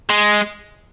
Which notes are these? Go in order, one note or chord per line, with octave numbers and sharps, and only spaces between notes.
G#3